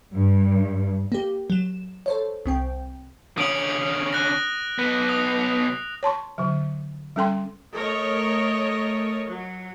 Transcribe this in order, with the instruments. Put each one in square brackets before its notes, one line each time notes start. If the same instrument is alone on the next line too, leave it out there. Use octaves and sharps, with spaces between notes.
[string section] G2
[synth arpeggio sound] A#3 G4
F#3 E7
A4 C5 C#5
C2 C4 G5
[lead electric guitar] D3 C#4 [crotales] D#6 D7 F#7
[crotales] F#6 A#6
[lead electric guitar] B1 B3
[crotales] D#6
[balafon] C#5 A5 C6 C#6
D3 F#3
G3 C#4 A4 G5 C6
[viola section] A3 A#4 C#5 D#5
F#3